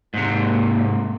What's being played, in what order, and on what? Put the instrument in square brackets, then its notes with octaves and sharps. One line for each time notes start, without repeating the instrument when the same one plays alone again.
[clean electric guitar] G#2 C3 [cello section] A#3